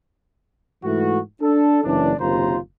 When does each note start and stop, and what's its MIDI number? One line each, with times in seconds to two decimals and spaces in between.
0.84 1.19 44
0.84 1.19 52
0.84 1.19 57
0.84 1.19 64
0.84 1.19 66
1.41 1.79 62
1.41 1.79 69
1.84 2.14 30
1.84 2.14 52
1.84 2.14 61
1.84 2.14 62
2.19 2.57 30
2.19 2.57 39
2.19 2.57 48
2.19 2.57 65
2.19 2.57 72
2.19 2.57 82